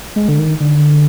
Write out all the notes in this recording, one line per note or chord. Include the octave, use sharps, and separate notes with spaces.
G#3
D3
D#3
D3